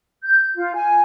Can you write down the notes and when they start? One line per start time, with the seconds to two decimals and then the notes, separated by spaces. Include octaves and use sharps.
0.25 G6
0.56 F4
0.74 G#5